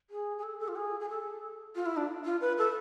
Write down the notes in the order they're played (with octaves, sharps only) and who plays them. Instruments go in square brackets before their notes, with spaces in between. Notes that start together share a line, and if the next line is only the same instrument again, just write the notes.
[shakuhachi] G#4
G#4
A4
A4
F4
G#4
G#4
A4
F4
E4
D4
F4
B4
A4